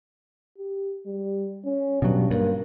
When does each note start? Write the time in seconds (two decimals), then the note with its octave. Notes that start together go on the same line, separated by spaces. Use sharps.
0.59 G4
1.06 G3
1.65 C#4
2.02 G2 B2 F#3
2.31 G2 A#3